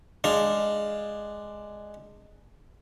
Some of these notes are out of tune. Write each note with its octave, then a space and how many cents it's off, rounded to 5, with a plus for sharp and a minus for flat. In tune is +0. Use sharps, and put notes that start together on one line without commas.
G#3 +0 D4 +15 F5 +0